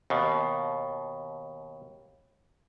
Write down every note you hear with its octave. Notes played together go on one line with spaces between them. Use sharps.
D#2 B2